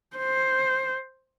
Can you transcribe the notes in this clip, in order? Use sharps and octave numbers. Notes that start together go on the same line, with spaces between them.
C5